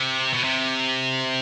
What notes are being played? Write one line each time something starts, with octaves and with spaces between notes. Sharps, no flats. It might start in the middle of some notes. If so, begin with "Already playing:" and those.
Already playing: C3
B2
C3